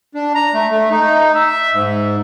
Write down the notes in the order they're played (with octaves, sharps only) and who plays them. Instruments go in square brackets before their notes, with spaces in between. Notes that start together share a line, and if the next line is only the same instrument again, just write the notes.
[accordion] D4
A#5
A3
A3
D#4
E5
G#2